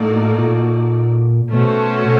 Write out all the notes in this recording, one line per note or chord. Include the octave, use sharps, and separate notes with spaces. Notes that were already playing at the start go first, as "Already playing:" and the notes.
Already playing: A2 A#3 D#4 F#4 A4 D5
A#2
B2 A3 C#4 F#4 A4 C5